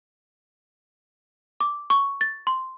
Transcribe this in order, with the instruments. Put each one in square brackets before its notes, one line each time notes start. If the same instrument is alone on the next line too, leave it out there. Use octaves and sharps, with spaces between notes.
[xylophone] D6
C#6
A6
C6